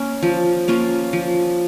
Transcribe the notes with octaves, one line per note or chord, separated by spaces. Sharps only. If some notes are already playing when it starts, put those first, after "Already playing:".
Already playing: A#3 C#4
F3
A#3 C#4 F4
F3